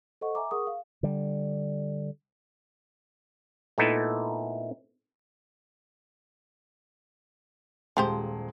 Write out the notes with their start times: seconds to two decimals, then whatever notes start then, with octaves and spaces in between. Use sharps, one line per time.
0.21 A4 C5 D#5 F#5 C#6
0.35 E5 G#5 A#5 D6
0.51 G#4 A#4 F#5 C#6 D#6
0.67 F5
1.03 D3 G3
3.78 A#2 A3 B3 D#4 E4 A4
7.97 D#1 F3 G#3 G4 C5